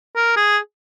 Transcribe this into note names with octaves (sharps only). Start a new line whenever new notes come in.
A#4
G#4